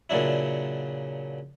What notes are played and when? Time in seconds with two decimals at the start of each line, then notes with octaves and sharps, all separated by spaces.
0.10 A#2 C#3 F#3 D4 E4